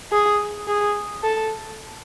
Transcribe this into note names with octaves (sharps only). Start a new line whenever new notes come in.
G#4
G#4
A4